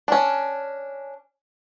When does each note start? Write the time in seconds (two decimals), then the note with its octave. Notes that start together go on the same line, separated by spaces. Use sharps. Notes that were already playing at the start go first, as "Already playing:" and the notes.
0.08 C#4 D4